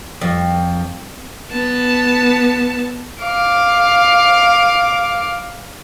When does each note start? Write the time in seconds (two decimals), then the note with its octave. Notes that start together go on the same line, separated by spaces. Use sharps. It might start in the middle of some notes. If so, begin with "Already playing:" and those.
0.21 F2
1.51 B3 A5
3.21 F5 D6